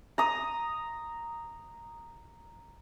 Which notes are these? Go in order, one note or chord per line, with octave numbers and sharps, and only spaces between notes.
A#5 D#6